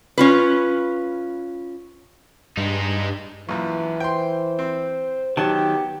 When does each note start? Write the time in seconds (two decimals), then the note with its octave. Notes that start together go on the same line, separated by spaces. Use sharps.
0.18 C#4 F4 B4
2.57 G2 G#3 D#4
3.49 A#1 F#2 E3
4.00 C5 G5 C6
4.59 C4
5.37 D#3 F#3 B3 G4 A5